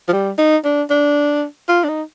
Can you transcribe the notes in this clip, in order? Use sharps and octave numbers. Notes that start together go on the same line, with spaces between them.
F3
G3
D#4
D4
D4
F4
D4
D#4